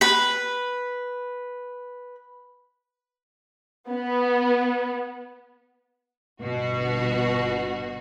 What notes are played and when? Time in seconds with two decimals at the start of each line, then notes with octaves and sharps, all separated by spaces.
0.01 B4 B5
3.90 B3
6.42 G1 B2 F#4